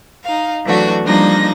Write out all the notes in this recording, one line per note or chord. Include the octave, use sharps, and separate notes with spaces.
D#4 F5
E3 F#3 A3 D4 F#4
F3 G3 A#3 D4 D#4 A#6